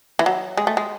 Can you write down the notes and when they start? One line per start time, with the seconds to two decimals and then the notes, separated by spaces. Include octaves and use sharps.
0.19 E3
0.26 F#3
0.57 G#3
0.67 A3
0.77 G#3